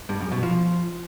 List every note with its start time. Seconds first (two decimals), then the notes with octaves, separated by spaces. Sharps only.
0.09 G2
0.20 F#2
0.32 B2
0.43 F3